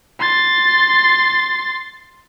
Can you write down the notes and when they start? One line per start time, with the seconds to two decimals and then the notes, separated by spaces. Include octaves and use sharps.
0.20 C6 A6